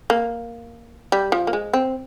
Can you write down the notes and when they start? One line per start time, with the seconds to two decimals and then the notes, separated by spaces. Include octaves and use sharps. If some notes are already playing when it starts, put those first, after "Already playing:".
0.10 A#3
1.12 G3
1.32 F3
1.47 A#3
1.53 G#3
1.73 C4